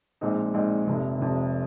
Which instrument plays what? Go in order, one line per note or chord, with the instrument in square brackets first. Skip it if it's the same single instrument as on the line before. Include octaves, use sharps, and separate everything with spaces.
[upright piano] A#1 A#2 G#3 C4 D#4
A#1 A#2 G#3 C4 D#4
F1 F2 C3
F1 F2 C3